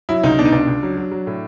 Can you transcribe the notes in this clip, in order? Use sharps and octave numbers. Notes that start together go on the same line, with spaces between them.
F#3 E4
C#2 D#4
B2 D4
D#4
C#2 D4
C#2
F#3
F#3
F#3
A2